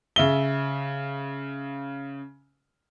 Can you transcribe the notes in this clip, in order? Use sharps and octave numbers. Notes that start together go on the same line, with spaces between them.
C#3 E5 G7